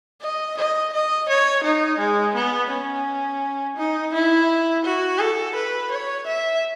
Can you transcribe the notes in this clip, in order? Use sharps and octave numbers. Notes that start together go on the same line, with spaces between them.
D#5
D#5
D#5
C#5
D#4
G#3
B3
C#4
D#4
E4
F#4
A4
B4
C#5
E5